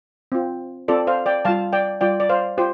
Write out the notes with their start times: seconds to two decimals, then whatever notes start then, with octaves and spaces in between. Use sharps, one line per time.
0.32 C4 F4
0.88 C4 F4 A4 D5
1.07 C5 F5
1.26 D5 G5
1.45 G3 F4 F5 A5
1.73 D5 G5
2.01 G3 F4 D5 G5
2.20 D5
2.29 C5 F5
2.58 F4 G4 C5